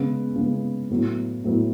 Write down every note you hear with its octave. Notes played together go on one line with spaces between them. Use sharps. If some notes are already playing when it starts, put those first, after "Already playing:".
Already playing: C#3 G#3 B3
C#3 G#3 B3
A2 F#3 B3
A2 F#3 B3